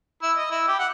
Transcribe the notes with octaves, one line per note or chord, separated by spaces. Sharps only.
E4
D#5
E4
G4
F#5